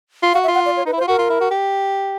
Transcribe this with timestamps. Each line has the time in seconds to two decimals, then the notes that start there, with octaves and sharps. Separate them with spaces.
0.23 F4
0.33 F#4 F5
0.43 E5
0.48 F4
0.54 F#5
0.65 D5
0.76 C#5
0.86 D#4 B4
0.93 E4
0.97 C5
1.01 F4
1.08 F#4 A#4
1.19 F4
1.30 E4
1.41 F#4
1.51 G4